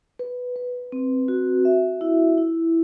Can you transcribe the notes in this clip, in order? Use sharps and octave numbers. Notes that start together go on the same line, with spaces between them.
B4
B4
C4
F#4
E5
E4
E4